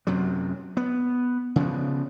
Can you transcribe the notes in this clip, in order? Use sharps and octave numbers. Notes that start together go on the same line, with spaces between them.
F#2 C3 F#3
B3
C#3 F3 B3